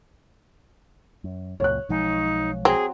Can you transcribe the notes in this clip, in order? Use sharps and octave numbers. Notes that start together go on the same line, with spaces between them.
F#2
C#2 F#2 A#2 C#5 F#6
B1 F3 G#3 D#4
F#3 C4 G#4